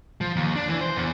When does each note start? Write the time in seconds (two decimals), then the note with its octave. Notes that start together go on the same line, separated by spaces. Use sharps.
0.21 F3
0.36 D#2
0.56 D4
0.69 E3
0.81 C5
0.96 E2